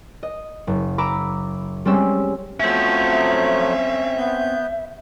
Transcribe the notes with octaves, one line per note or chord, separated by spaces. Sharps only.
D#5
F#1
A#5 B5 D6 E6
G3 G#3 C4 C#4 E6
F3 F#3 A3 C4 C#4 E5
B3 G6